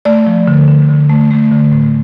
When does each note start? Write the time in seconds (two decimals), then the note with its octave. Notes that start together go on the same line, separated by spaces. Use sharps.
0.05 A3 D5
0.27 F3
0.48 D3
0.68 D3
0.89 D3
1.10 A3
1.31 A3
1.52 D3
1.72 A2